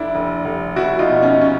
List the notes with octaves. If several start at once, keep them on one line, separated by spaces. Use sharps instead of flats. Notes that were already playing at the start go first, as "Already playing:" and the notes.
Already playing: F1 D4 E4
F1
F1
F1 E4 F#4
D#4 F4
B2
C#4 D#4
C#4